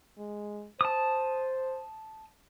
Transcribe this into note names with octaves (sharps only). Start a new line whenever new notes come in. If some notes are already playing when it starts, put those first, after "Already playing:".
G#3
C5 A5 D#6